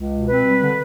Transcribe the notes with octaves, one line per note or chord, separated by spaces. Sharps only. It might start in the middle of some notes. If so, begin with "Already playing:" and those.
Already playing: C#2
B2
C4 B4
G3
D3